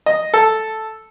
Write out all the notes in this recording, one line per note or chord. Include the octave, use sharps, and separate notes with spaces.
D#5
A4